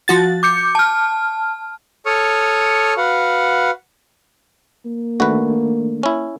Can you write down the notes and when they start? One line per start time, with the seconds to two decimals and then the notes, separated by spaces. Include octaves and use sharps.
0.08 F3 F#4 A6
0.43 D6 G6 C#7
0.75 A5 F6
2.06 A4 C#5 C#6 D#6 F6
2.97 F#4 B4 F5 F#5
4.86 A#3
5.20 D#3 A3 D4 F#4 B4
6.03 C#4 E4